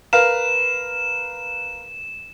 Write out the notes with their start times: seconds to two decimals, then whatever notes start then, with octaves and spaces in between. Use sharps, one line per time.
0.13 A#4 B4 F5 E7